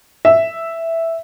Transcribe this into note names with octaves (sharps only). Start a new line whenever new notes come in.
E5